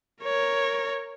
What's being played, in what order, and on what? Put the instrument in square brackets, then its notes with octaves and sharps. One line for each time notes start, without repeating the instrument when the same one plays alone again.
[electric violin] A#4 C#5